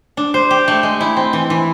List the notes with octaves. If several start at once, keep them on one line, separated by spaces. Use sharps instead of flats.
D4
C5
G4
A3
G#3
E4
C4
E3
E3